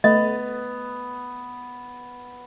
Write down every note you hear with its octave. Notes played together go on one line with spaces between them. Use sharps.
A3 B3 D#5